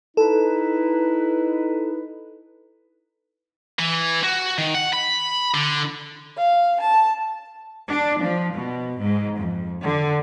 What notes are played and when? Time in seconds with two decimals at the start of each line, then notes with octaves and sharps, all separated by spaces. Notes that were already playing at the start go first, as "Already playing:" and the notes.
0.17 D#4 E4 A4 B4
3.79 E3
4.24 F#4
4.58 D#3
4.74 F#5
4.93 B5
5.54 D3
6.36 F5
6.80 A5
7.90 D4
8.23 F3
8.55 B2
9.01 G#2
9.40 F2
9.81 D3